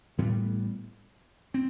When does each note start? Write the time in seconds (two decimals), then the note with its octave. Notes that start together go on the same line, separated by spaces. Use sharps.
0.17 A1 A2 G3 B3
1.54 C4